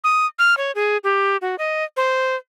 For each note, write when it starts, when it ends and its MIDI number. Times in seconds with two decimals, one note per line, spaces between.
0.04 0.26 87
0.39 0.57 89
0.57 0.72 73
0.75 0.97 68
1.04 1.37 67
1.42 1.56 66
1.59 1.84 75
1.97 2.36 72